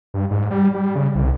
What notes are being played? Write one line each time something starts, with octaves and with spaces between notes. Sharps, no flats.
G2
G#2
G3
G3
C#3
C2